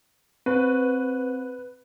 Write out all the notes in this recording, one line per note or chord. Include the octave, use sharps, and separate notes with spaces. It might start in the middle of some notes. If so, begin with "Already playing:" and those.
C4 B4